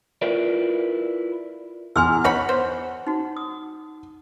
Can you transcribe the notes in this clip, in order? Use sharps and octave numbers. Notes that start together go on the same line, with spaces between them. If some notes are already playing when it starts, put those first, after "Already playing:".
E4 F4 A#4 B4 D5
E2 G#5 C6 E6 F6
D#4 C#5 F#5 B5
C5
D#4 F#4
D#6